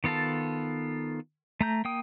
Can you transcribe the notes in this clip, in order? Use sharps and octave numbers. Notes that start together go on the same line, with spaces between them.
D#3 B3 F4 A4 A5
A3 A#5 G6
A#3 G5 D#6